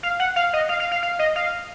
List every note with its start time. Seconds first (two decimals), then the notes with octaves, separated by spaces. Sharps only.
0.03 F5
0.20 F#5
0.36 F5
0.53 D#5
0.69 F5
0.80 F5
0.92 F5
1.03 F5
1.19 D#5
1.36 F5